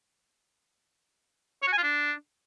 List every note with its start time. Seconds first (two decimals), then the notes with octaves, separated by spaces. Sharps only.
1.62 C#5
1.68 F#4
1.73 G#5
1.78 F4
1.83 D4